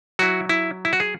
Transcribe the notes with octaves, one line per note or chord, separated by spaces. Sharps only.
F#3 E4 F#4
E4
E4
F#4
G#4